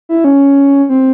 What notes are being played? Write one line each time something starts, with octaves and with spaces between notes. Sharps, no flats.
E4
C#4
C4